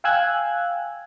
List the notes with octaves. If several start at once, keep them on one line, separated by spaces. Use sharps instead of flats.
F5 G5 G#5 E6 F#6 G#6